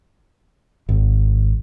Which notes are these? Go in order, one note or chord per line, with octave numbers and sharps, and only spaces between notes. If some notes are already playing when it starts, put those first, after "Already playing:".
G#1